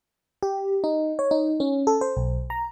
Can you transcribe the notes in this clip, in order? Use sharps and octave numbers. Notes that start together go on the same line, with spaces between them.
G4
D#4
C#5
D#4
C#4
A4
C5
B1
A#5